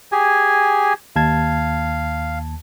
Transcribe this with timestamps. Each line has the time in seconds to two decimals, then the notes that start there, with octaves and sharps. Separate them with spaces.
0.12 G4 G#4 G#5
1.16 D#2 F5 A5 G#6